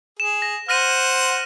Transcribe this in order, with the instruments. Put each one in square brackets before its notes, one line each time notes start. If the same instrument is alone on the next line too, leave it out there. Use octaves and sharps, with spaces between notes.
[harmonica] G#4 [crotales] E7
[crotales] A#6
[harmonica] C5 F#5 [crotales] F6 A#6 D#7